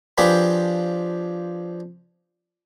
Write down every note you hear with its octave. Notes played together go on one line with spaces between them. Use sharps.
F3 D4 G4 G#4 B4 B5